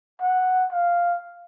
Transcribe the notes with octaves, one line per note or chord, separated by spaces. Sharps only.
F#5
F5